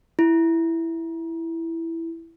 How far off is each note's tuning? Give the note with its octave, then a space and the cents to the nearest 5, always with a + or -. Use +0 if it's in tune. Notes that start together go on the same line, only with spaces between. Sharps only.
E4 +5